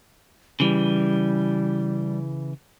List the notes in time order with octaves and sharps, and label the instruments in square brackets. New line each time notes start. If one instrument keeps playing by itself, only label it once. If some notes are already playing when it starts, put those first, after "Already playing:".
[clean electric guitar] C#3 E3 [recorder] G3